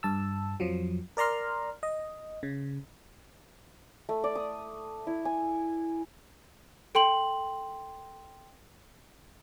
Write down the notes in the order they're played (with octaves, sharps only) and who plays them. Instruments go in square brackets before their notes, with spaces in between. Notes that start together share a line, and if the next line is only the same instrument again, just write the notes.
[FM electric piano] G2 A5 E6
F2 F3 F#3
A#4 D5 A#5 C6 F6
D#5
C#3
[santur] A3
D5
D#6
E4
G#5
[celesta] A4 G5 C6 F#7